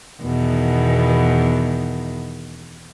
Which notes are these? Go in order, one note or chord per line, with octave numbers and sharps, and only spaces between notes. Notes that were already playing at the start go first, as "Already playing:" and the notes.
E2 B2 D#3